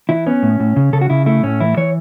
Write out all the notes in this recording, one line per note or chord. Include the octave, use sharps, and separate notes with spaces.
E3 E4
B3 C#4
A2
A2
C#3
C#3 A4
F#4
C#3 E4
A3 E4
A2 C#4
E3 E4
E3 C#5